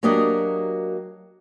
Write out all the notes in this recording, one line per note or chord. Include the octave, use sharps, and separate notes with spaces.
F#3 A#3 D4 G4 D#5